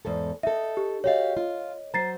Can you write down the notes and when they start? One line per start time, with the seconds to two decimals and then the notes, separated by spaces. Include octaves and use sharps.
0.05 E2 G#2 A4
0.43 D#4 A4 E5
0.77 G4
1.04 F#4 G4 C#5 D#5 F5
1.37 F4
1.94 F#3 C5 A#5 A6 C7